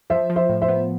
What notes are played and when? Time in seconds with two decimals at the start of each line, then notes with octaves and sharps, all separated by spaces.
0.10 F3 C5 E5
0.30 F3
0.36 C5 E5
0.49 A2
0.62 C5 E5
0.68 B3